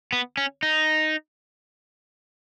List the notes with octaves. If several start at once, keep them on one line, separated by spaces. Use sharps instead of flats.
B3
C#4
D#4